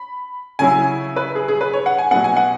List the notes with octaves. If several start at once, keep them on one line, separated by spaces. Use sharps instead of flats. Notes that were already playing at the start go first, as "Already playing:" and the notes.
Already playing: B5
C#3 F#3 C#4 E4 G#5
B4
G#4
G#4
B4
C#5
F#5
G#5
B2 F#3 B3 F#5
G#5
F#5